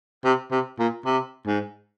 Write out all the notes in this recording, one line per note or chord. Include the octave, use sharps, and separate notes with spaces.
C3
C3
A#2
C3
G#2